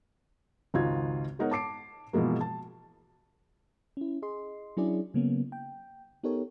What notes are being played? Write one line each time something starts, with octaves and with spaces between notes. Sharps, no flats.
G#1 C#2 D#4 F4 F#4 G#6
G#3 B3 D#4 A#4 C#5 F#5
A5 D6 C7 D7
B2 E3 F3 G#3 A#3
A5
C#4 E4
G#4 D#5 C6
F#3 C#4 D4 E4 G#4 D5
C#3 F#3 A#3 B3 C#4
G5
B3 D#4 G4 A4 A#4 C#5